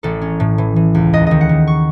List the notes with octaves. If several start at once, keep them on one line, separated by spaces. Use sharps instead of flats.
A1 A4
C#4
A2
E3
E3
C#2
D#2 D#5
D#3 D#5
F#5
D#3
C#6